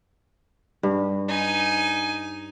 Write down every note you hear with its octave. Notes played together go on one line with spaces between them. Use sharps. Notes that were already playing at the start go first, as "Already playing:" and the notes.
G2
D#4 G#5